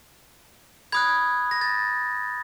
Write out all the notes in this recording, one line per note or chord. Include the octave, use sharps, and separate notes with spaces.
B5 D#6 F#6 G#6
A#6
A6